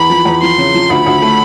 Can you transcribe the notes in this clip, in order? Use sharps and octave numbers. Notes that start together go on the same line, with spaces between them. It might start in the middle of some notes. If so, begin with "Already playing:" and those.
Already playing: E2 B5
F3
E2
F3 C6
C#3
F3
D2 B5
D2
A3